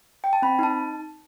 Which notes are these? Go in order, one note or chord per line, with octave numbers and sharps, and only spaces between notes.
G5
A5
C4 B5
D#4 A5